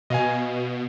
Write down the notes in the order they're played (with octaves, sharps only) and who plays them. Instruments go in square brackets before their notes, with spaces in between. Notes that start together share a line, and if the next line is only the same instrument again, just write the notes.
[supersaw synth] B2 [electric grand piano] D#5 F5 G#5